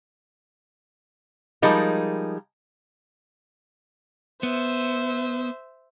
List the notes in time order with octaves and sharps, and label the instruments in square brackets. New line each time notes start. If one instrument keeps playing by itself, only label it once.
[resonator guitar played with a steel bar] F3 G3 G#3 D#4 A#4
[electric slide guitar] B3 [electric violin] C5 E5